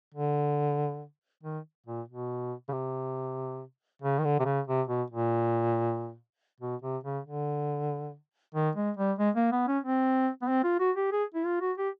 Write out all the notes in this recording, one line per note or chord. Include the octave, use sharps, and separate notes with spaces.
D3
D#3
A#2
B2
C#3
C3
C#3
D#3
D3
C3
C#3
C3
B2
A#2
B2
C3
C#3
D3
D#3
G#3
G3
G#3
A#3
B3
C#4
C4
B3
C4
F4
F#4
G4
G#4
E4
F4
F#4
G4